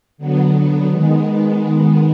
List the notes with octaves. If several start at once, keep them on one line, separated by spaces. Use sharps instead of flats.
D3 F#3 B3
D#3 G#3 B3